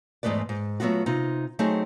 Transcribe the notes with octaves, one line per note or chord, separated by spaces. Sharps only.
E2 G#2 G#3 A3 B4 D5
G#2
F#3 A3 B3 F4 F#4
C3 D#4 F4
F#3 A3 C4 D#4 F#4 G#4